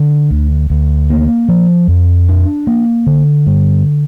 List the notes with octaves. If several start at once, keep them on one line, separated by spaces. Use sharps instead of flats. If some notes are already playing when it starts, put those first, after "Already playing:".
Already playing: D3
D2
D2
A#3
F3
F2
D4
A#3
D3
G2